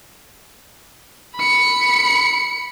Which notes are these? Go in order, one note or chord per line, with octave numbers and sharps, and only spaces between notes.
B5 C#7